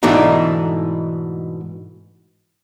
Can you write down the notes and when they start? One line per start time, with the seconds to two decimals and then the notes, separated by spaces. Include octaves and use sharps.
0.03 G#2 B2 E3 A3 D4 D#4